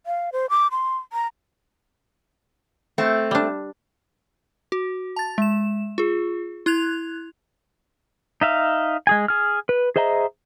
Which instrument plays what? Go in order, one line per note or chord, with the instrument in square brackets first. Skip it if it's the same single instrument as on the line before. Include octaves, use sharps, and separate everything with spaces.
[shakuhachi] F5
C5
D6
C6
A#5
[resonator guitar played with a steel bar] A3 C4
[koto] G3 D4
[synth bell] F#4
A5 A6
G#3 E7
F4 G#4
E4 F#6 G#6 F7
[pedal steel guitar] D#4 E5 F5
G#3 G#4 G#5
G#4 F6
B4
G#4 C5 D#5 E5 A#5